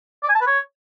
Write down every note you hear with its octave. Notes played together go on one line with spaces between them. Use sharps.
D5
G#5
A5
B4
C#5